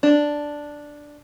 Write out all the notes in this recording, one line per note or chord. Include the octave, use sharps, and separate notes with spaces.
D4